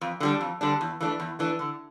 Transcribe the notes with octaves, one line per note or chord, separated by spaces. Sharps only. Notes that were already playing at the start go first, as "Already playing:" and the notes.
F2
D3 G3 D4
F2
D3 G3 D4
E2
E3 A3 D4
E2
E3 A3 D4
D3